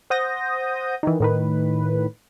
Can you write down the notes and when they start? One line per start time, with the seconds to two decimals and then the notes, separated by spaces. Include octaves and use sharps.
0.10 C5 F#5 D#6 G6 A#6
1.03 D#3 E3
1.20 A2 D#3 B4